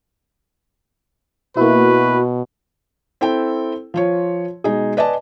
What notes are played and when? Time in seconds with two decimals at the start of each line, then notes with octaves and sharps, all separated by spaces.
1.57 B2 A#3 E4 F#4 B4
3.21 C4 E4 A4 G5
3.94 F3 F4 C#5
4.64 B2 G#3 D#4 G#4
4.97 B4 D5 D#5 G#5 A5